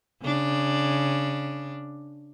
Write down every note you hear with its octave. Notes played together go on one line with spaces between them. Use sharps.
C#3 D4